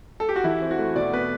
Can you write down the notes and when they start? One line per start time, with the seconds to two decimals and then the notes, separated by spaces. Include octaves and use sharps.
0.20 A4
0.29 G4
0.36 F#4
0.44 E3 E4
0.61 C4
0.71 F#4
0.79 A3
0.96 B2 D5
1.13 B3 B4